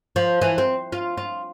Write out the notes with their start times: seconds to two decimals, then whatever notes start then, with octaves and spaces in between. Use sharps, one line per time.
0.16 F3
0.42 E3
0.58 C4
0.92 F4
1.17 F4